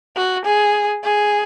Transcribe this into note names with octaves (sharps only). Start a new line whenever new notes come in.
F#4
G#4
G#4